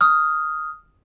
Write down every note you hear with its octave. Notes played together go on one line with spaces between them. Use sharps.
D#6 F6